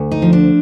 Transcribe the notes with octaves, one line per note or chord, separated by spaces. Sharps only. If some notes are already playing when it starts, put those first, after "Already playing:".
Already playing: D2
D#4
F3
D4